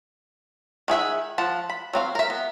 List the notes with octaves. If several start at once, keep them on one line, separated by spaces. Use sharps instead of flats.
D#3 G#4 E5 F#5
F3 F#5 A5
B5
F#3 C4 F5
A#4 E5
B3